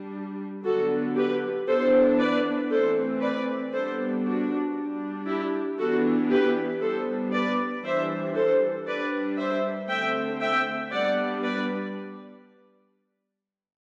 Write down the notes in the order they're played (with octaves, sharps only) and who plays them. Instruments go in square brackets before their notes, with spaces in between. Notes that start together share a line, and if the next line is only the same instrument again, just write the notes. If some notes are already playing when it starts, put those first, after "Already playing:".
Already playing: [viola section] G3 D4
D3 F#3 B3 D4 F#4 A4
G4 B4
E3 B3 D4 A4 C5
B4 D5
E3 A3 C4 A4 C5
B4 D5
G3 B3 D4 A4 C5
D4 F#4
G3 D4
E4 G4
E3 B3 D4 F#4 A4
G4 B4
G3 B3 D4 A4 C5
B4 D5
E3 G3 D4 C5 E5
A4 C5
G3 D4 B4 D5
C5 E5
D3 A3 C4 E5 G5
E5 G5
G3 B3 D4 D5 F#5
B4 D5